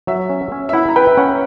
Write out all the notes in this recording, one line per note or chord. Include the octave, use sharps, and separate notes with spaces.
F#3 E5
C#4
C#4
E5
E4 F#5
A#5
B4 G5
C#4 F#5